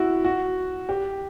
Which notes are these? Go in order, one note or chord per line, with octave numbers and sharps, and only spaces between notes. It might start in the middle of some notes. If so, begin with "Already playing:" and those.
Already playing: E4 F#4
F#4
G4